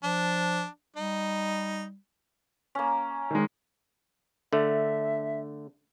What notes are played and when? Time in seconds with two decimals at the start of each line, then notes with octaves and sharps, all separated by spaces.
0.04 F3 D4
0.96 G3 D#4
2.75 A#3 C#4
3.31 D#3 G#3
4.53 D3 A3 E5